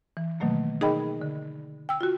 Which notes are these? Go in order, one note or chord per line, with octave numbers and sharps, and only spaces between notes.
E3
B2 D#3 F#3 A3 A#3
D#4 G#4 A#4 D#5 G5 B5
D3
G5 E6
F4 F#4